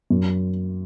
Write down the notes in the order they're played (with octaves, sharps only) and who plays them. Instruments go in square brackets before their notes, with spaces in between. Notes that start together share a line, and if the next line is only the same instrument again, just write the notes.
[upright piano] F#2